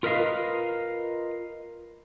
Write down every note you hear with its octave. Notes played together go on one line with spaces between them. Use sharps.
F4 A#4 B4 D#5 F5